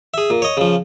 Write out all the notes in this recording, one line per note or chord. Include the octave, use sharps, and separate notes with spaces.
G#4 E5
A#2
C#5 D#5
C#3 F3